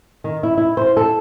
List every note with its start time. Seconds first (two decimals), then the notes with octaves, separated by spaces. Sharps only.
0.24 D#3
0.43 E4
0.58 E4
0.77 C5
0.97 A4